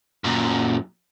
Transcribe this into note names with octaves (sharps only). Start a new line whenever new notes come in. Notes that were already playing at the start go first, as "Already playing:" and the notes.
F#2 A#2